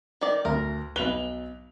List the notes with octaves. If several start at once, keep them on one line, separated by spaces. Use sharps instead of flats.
D#3 D5
D2 A#4
B1 B4 F7 G7